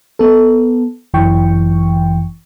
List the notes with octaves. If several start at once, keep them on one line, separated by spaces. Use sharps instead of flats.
B3 A4
G1 F#2 E3 G5 C#6